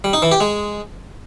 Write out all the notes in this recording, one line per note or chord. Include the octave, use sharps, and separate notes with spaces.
G3
D#4
E3
G4
G#3